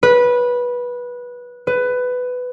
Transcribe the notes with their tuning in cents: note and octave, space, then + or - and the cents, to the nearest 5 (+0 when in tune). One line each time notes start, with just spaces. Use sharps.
B4 -15
B4 +15